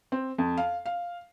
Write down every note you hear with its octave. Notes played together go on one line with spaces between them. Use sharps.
C4
F2
F5
F5